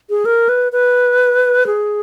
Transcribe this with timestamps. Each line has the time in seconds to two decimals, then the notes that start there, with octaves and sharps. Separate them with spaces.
0.10 G#4
0.25 A#4
0.49 B4
0.72 B4
1.67 G#4